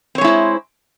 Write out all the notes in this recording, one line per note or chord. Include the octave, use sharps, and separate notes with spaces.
G#3 C4 E4 C5 C#5